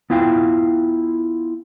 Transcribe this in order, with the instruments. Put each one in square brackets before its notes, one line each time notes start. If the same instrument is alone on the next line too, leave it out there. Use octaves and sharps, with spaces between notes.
[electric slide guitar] B3 E4 F4 F5 G5